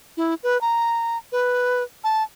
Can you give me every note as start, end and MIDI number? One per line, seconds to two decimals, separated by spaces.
0.17 0.35 64
0.43 0.60 71
0.61 1.18 82
1.32 1.83 71
2.04 2.23 81